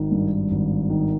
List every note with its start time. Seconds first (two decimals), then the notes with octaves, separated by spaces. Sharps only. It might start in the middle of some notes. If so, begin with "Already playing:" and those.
Already playing: G#1 D#3
0.11 G2
0.51 G#1
0.90 D#3